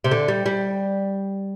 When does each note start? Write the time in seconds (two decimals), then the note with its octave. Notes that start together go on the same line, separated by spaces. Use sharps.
0.04 C3
0.11 D3
0.28 G3
0.46 G3